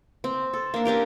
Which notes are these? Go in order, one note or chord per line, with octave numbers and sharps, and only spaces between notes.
C4
A4
A#3 D4
C#4 D4 G4 A#4